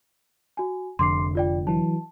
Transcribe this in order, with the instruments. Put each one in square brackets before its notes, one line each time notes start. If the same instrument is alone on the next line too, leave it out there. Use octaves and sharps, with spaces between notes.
[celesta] F#4 G#5
[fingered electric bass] F1 D3 [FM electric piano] F2 [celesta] C6 D6 C7
[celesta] F4 D5 G5
[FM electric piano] E3 F#3 [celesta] A5